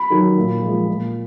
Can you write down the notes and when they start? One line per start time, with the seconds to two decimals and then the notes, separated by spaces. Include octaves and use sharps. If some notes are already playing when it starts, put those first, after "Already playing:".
Already playing: B5
0.10 D#3 F#3
0.37 A#2
0.62 F3 G#3
0.87 A#2